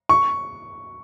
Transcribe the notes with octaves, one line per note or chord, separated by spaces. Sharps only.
C#6